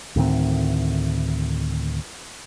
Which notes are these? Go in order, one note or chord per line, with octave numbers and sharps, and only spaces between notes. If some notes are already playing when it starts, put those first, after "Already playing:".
D2 A2 D#3 C4